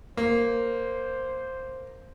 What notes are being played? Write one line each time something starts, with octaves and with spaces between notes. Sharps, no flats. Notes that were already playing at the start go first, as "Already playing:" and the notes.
A#3 C5